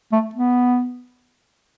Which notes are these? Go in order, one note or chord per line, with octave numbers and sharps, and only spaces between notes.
A3
B3